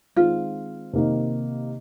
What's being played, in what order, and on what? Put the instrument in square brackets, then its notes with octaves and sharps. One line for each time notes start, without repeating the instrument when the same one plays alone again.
[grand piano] D#3 G#3 C4 [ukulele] F4
[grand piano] C3 D#3 A#3 D#4